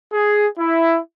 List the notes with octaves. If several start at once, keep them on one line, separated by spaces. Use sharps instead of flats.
G#4
E4